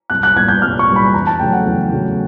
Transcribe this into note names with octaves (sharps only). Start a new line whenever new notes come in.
C2 F#6
F#6
A#2 G3 B3 G#6
G6
C2 F6
C#6
A#2 G3 B3
B5
E2 A#5
A5
C#3 F#3 A3 G5
F#5
E2
C#3 F#3 A3